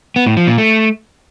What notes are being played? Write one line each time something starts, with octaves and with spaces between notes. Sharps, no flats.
B3
A2
F3
A#2
A3